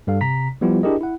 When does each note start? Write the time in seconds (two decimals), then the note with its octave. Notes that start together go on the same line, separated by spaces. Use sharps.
0.07 G2 G3 A4 F5
0.21 C3 A#5 B6
0.61 F3 G3 B3 E4 F4 G4
0.83 D4 E4 G4 G#4 A#4 D#5
1.01 E4 F#5